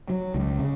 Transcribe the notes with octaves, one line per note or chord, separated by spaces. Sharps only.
F#3
C#2
C#3